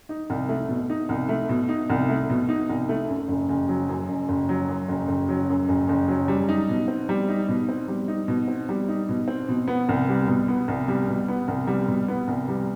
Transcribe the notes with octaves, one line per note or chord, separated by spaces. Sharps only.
D#4
C2
A3
B2
D#4
C2
A3
B2
D#4
C2
A3
B2
D#4
C2
A3
F#2
F#1
F#1
F#3
F#2
F#1
F#1
F#3
F#2
F#1
F#1
F#3
F#2
F#1
F#1
F#3
G3
D#4
B2
C4
G3
D#4
B2
C4
G3
D#4
B2
C4
G3
D#4
B2
C4
B2
B3
C2
G3
B2
B3
C2
G3
B2
B3
C2
G3
B2
B3
C2
G3